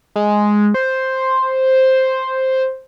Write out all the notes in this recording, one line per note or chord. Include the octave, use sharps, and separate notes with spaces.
G#3
C5